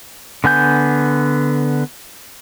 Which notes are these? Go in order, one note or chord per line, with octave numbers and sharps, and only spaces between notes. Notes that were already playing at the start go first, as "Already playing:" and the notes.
D3 B3 G#5 G6